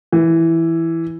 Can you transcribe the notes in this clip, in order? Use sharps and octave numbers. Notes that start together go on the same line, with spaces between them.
E3